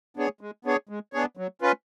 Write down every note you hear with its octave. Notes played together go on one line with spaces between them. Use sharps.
B3 D4 G#4 C#5
G#3
B3 D4 G#4 C#5
G#3
B3 D4 G#4 C#5
F#3
C#4 F4 B4